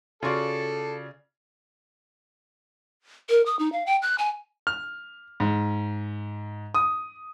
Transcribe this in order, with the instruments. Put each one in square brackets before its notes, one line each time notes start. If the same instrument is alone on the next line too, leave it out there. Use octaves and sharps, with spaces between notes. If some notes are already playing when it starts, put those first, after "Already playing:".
[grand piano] C#3 D5 [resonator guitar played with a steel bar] F4 F#4 F5 [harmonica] A4
[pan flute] A#4
D#6
D#4
F5
G5
F#6
G#5
[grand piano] F6
G#2
D#6